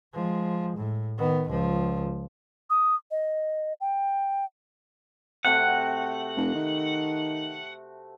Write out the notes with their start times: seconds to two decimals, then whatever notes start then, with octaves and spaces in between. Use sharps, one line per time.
0.14 F3 G#3
0.77 A2
1.18 D#3 B3
1.49 C#2 F3
2.70 D#6
3.11 D#5
3.81 G5
5.45 C3 A3 F#4 F#5
6.36 F1
6.55 D#3